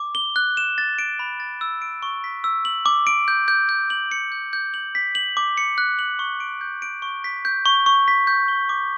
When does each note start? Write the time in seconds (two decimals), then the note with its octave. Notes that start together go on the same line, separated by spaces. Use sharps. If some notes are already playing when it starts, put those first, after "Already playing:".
Already playing: D6
0.15 G7
0.36 F#6
0.57 E7
0.78 A6
0.99 D7
1.19 B5
1.40 A6
1.61 E6
1.82 D7
2.03 C#6
2.24 B6
2.44 E6
2.65 F#7
2.86 D6
3.07 D7
3.28 G6
3.48 G6
3.69 G6
3.90 F#7
4.11 C#7
4.32 G6
4.53 G6
4.74 F#7
4.95 B6
5.15 F#7
5.37 D6
5.58 C#7
5.78 F#6
5.99 F#7
6.19 C#6
6.40 D7
6.61 G6
6.82 D7
7.02 C#6
7.24 B6
7.45 G6
7.66 C#6
7.86 C#6
8.08 B6
8.27 G6
8.48 G7
8.69 D6